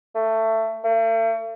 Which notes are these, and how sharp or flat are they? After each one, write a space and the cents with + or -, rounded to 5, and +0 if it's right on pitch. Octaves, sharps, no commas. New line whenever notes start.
A3 +20
A3 +45